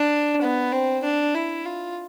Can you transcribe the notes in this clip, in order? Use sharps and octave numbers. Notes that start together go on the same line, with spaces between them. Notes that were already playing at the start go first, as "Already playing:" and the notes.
Already playing: D4
B3
C4
D4
E4
F4